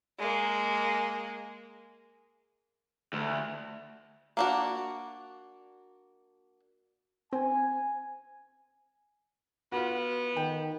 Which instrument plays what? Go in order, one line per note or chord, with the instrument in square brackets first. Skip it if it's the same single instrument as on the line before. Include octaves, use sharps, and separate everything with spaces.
[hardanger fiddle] G#3 A#3
[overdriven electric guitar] D2
[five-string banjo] A#3 D4 F#4
[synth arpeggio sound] C4 [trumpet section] G#5
[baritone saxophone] B3 [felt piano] F4 F#4
[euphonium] D#3 [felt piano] G5